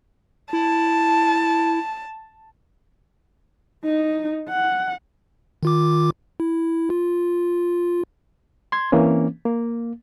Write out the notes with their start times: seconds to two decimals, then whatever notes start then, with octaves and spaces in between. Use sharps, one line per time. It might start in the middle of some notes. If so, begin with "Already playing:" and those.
0.53 E4 A5
3.84 D#4
4.49 F#5
5.63 D#3 F4 D6
6.40 E4
6.90 F4
8.72 C6 G#6
8.92 E3 A#3 C4 C#4
9.45 A#3